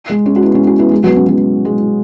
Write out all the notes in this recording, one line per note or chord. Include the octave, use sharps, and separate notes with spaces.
G#3
G#3 C#4
F#4
B3 E4
G#3 C#4
C#4 F#4
B3 E4
G#3
F#3 B3
G#3 C#4
F#3 B3
G#3